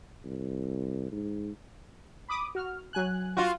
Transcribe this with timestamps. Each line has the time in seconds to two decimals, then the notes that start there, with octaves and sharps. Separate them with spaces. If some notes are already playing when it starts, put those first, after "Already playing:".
0.25 C2
1.12 G#2
2.29 B5 D6 D#6
2.55 F#4 F6
2.93 F#3 G#5 F#6
3.37 F4 F#4